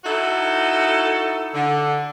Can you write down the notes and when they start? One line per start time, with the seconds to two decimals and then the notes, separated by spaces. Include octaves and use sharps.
0.05 D#4 E4 F#4 A4
1.54 D3